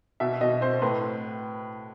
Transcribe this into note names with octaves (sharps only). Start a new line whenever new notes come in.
B2 E5
B2 D#5
C4 C5
A2 B4